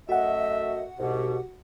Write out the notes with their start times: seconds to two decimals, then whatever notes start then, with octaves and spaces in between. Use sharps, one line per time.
0.09 F#2 A3 F#4 D#5 E5 F#5
0.99 C2 G#2 B2 G4